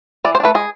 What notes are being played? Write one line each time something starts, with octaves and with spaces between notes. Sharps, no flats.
E3 D5
C5
D4
A3 B4
G#3 G#4